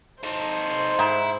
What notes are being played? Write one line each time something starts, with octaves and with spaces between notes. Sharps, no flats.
D#4 A4 C5
G#2 E4